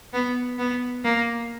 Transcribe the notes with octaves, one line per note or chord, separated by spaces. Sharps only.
B3
B3
A#3